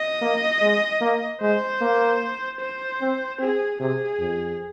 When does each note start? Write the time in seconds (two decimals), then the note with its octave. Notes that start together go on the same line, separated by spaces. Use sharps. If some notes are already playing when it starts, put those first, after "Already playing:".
Already playing: D#5
0.22 A#3
0.62 G#3
1.01 A#3
1.41 G#3 C5
1.81 A#3
2.60 C5
3.01 C4
3.39 C4 G#4
3.80 C3 G#4
4.19 F2